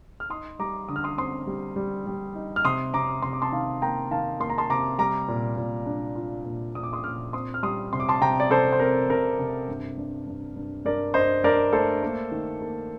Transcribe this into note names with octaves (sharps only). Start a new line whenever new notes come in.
F6
D#4 C6 D#6
G3 A#5 D6
D3 D#6
F6
C6 D#6
C4 C6 D#6
G3
G3
G3
D#4
F6
C3 C6 D#6
C3 A#5 D6
C3 C6
D6
A5 C6
D#3 F5 A5
A#3 G5 A#5
D#3 F5 A5
A#3 C6
A#5
A5 C6
C3 A#5 D6
G3 A#5 D6
A#2
A#2
D4
F4
A#2
A#2 D#6
D6
C6 D#6
A#2 D6 F6
C4 C6 D#6
F6
G3 C6 D#6
C3 C6
D6
A5 C6
C3 G5 A#5
D5
C3 A4 C5
C5
C4 A#4
C3 A#4
C3
G2
G2
G2
G2
G2 A#4 D5
G2 C5 D#5
G2 A#4 D5
A3 A4 C5
A#3
D#3
A#3